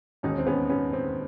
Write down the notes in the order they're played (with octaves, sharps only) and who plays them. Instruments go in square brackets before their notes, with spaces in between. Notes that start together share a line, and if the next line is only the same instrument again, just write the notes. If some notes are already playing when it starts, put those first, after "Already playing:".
[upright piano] E1 D#2 D#3 C#4 D#4
C4
B3 C#4
B3 C#4
C4